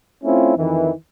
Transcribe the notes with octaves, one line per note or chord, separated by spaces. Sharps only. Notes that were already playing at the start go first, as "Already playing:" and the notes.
A3 C4 C#4 E4 F4
F2 D#3 E3